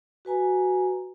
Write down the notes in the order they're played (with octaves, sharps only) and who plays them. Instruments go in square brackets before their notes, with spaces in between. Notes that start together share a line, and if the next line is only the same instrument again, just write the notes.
[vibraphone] F#4 B4 G#5 A#5